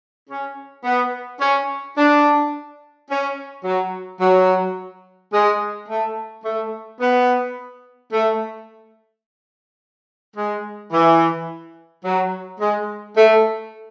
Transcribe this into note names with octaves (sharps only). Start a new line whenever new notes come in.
C#4
B3
C#4
D4
C#4
F#3
F#3
G#3
A3
A3
B3
A3
G#3
E3
F#3
G#3
A3